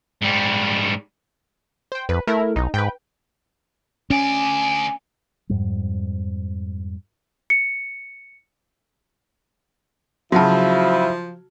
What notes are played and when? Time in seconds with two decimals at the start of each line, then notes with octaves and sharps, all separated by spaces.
0.22 G#2 G3
1.92 C5 G5
2.09 F2 B4
2.27 A3 E4 A#4
2.56 B1 D#4
2.74 G#2 B4 G5
4.10 D2 C#4 D5 G#5
5.49 F2 G#2 G3
7.50 C#7
10.32 C#3 F3 F#3 E4 F#4 A5